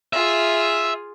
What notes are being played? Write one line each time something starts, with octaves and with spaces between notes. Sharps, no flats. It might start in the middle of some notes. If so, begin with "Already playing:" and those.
F4 G#4 E5